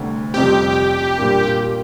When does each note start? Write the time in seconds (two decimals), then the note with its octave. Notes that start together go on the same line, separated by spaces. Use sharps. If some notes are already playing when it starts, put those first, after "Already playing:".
Already playing: D2 C3 G3
0.34 F2 C3 G3 C4 G4
1.16 A#2 G3 A#3 D4